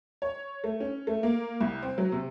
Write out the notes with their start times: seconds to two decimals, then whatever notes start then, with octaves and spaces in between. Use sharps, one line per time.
0.22 C#5
0.64 A3
0.80 C#4
1.07 A3
1.23 A#3
1.61 C2
1.83 C4
1.98 F#3
2.12 C3